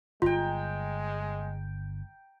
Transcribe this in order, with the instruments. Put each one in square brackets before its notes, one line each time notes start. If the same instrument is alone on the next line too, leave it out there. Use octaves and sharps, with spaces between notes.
[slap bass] G1 [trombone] G#3 [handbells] F4 [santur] G5 A#5